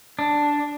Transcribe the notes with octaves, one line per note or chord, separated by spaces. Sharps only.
D4